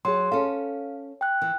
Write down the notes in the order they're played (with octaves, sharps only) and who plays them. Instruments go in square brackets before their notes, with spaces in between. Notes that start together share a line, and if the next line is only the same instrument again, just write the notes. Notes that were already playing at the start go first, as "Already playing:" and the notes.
[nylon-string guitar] F#3 [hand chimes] G#4 C6
[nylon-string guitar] C#4 A4 [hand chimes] F5
[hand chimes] G5 F#6
[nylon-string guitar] E3